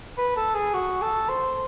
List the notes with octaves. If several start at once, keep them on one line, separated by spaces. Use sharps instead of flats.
B4
A4
G#4
F#4
A4
C5